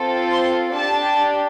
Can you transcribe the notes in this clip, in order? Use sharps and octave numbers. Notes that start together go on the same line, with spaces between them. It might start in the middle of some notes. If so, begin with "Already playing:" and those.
Already playing: C4 F4 A4
C6
D4 G4 A5